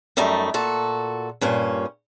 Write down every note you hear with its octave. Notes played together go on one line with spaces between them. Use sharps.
F#2 G3 A3 D#4
A#2 F#4 A4
G2 A#2 C#4